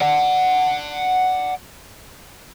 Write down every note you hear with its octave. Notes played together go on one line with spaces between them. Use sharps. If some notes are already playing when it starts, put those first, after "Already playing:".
D5 F#5